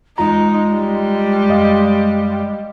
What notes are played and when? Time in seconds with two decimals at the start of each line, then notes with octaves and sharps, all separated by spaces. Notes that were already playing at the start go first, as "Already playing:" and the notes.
0.18 E2 G#3 D#4 F4 A#5
0.73 G3
1.49 F#2 D#5 F5